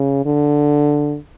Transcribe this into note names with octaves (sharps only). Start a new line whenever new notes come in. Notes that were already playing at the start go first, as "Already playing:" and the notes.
Already playing: C#3
D3